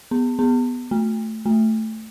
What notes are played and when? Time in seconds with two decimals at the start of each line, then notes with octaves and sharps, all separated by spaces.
0.11 B3
0.39 B3
0.91 A3
1.46 A3